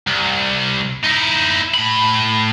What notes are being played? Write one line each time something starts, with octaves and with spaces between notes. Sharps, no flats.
C2
D#4 E4
A2 B5